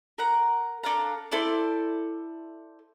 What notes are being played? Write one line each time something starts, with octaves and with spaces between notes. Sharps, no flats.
A#4 F#5 A#5
D4 A4 F5 A#5
E4 A4 C5 D5